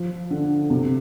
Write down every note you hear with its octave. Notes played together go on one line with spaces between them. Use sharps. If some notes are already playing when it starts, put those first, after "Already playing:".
Already playing: F3
D3
C3